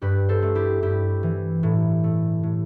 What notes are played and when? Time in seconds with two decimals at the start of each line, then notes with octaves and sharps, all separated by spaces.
0.02 G2 G4 B4
0.29 A4 C5
0.42 A3
0.55 E4 G4
0.82 G2 E4 G4
1.23 E3
1.63 A2
2.04 A3
2.43 A2